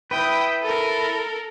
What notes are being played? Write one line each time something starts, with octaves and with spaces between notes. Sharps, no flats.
E4 B4 G5 D#6
A4 A#4